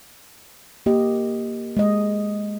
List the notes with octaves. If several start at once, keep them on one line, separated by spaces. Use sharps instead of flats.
A#3 G4 D#5
G#3 D#5